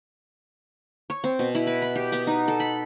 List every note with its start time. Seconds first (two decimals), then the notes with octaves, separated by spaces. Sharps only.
1.10 C#5
1.24 C4
1.39 B2
1.55 E4
1.67 B4
1.82 B5
1.96 G4
2.12 B3
2.27 D#4
2.48 A4
2.60 B5